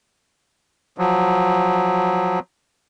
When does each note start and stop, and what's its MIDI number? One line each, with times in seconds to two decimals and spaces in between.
0.98 2.39 53
0.98 2.39 54